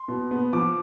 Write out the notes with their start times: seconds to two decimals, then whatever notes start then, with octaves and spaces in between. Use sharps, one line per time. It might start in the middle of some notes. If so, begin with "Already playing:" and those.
Already playing: C6
0.08 B2
0.31 B3
0.53 F3 D6